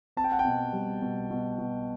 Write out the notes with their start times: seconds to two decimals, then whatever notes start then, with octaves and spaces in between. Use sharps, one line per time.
0.17 C4 A5
0.24 G5
0.32 F#5
0.39 G5
0.45 B2
0.73 G3
1.02 B2
1.31 B2
1.59 B2